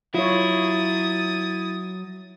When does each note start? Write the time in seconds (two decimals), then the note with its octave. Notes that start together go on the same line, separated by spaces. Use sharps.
0.15 F#3 E4 F4 C#5 D#6 A6